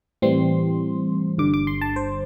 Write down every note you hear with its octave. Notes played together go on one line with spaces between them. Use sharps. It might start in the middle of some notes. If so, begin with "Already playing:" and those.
A2 E3 G3 C4 C6
G1 G2 D3 D6
D6
C6
A5
C5